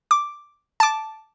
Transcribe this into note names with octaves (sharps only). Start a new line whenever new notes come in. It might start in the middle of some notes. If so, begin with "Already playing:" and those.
D6
A5 D6